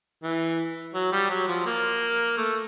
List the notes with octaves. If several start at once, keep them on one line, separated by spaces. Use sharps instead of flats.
E3
F#3
G3
F#3
F3
A#3
A3